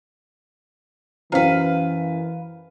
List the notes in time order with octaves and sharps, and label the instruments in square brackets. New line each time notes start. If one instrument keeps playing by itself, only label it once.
[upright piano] F#2 [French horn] E3 [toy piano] E4 C5 G5 [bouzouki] B4 F5